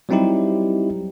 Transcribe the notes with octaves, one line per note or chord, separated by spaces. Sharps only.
F#3 G3 C4 D#4 E4 G4